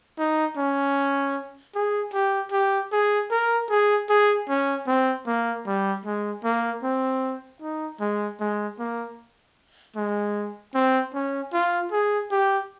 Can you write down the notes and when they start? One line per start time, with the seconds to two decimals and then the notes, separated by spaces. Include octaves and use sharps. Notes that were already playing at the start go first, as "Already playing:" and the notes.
0.18 D#4
0.57 C#4
1.75 G#4
2.13 G4
2.52 G4
2.92 G#4
3.31 A#4
3.70 G#4
4.09 G#4
4.49 C#4
4.87 C4
5.26 A#3
5.66 G3
6.05 G#3
6.44 A#3
6.83 C4
7.62 D#4
8.00 G#3
8.40 G#3
8.79 A#3
9.96 G#3
10.75 C4
11.14 C#4
11.53 F4
11.92 G#4
12.31 G4